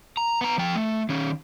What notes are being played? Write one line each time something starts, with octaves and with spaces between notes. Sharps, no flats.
A#5
B3 A#5
F3 G5
A3
D#3 C#4